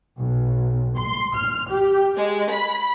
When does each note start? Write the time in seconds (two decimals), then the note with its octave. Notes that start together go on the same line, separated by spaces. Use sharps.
0.17 B1
0.98 C6
1.36 F6
1.70 G4
2.18 G#3
2.51 B5